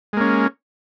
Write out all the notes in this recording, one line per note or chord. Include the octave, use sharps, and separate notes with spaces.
G#3 A#3 C#4